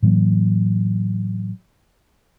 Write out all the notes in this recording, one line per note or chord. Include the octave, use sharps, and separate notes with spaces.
A2 E3 F#3 A#3